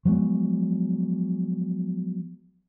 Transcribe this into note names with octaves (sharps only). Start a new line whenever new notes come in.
F3 F#3 G#3 B3